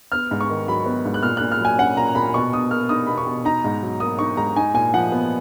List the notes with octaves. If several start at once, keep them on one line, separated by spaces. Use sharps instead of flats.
B3 F6
G#2
C#6
D#3
F#3 B5
B3
G#2
F#6
A#2 F6
A#2 F#6
F6
F#3 G#5
C#4 F#5
A#2 A#5
A#2 B5
B2 C#6
B2 D#6
A#3 F6
D#4 D#6
B2 B5
C#6
B2
D#4 A#5
G#2
F#3
A#3 D#6
D#4 C#6
G#2 A#5
D#4 G#5
A#2 G#5
F3 F#5
B3